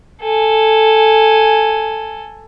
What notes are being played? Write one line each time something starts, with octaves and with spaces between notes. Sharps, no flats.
A4 G#5